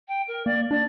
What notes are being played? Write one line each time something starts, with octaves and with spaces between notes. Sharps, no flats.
G5
A#4
A#3 D5
D4 D5